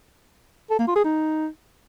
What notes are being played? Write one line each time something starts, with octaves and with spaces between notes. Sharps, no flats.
A4
A#3
F4
G#4
D#4